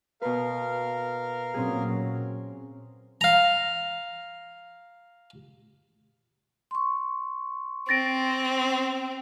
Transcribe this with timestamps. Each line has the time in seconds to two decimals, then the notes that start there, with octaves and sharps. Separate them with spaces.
0.22 B2 A#4 B4 F5
1.54 A#2 F#3 C4 C#4 G#4
3.21 F5 A#5
6.71 C6 C#6
7.89 C4 A6 A#6 D7